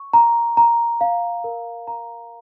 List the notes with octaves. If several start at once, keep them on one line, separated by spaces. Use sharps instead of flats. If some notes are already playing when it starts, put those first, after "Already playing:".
Already playing: C#6
A#5
A#5
F5
A#4
A#5